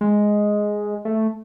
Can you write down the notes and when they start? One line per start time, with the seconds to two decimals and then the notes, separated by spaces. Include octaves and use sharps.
0.01 G#3
1.05 A3